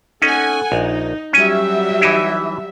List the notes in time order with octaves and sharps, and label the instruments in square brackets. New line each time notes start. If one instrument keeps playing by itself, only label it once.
[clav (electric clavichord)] C#4 D#4 [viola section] A4 F#5 G#5
[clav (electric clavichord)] A#1 [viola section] D#4
[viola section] F#3 G3 E5 [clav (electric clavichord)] C#4 G#5
[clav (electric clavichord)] E3 D#4 E4